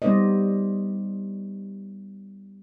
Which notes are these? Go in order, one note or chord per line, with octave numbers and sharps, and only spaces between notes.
G3 B3 D#4 C5 D5 D#5